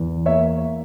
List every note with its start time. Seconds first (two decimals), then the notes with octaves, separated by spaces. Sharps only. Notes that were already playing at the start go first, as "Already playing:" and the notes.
Already playing: E2 E3
0.26 A#3 C#5 E5